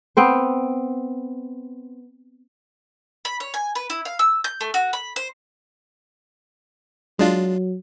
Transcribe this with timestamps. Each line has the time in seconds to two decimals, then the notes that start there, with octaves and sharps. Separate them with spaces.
0.17 B3 C4 C5
3.25 B5
3.40 C#5
3.54 G#5
3.75 B4
3.90 E4
4.05 F5
4.19 E6
4.44 G6
4.61 A3
4.74 F#4
4.93 B5
5.16 C5
7.19 F#3 G#3 D4 F4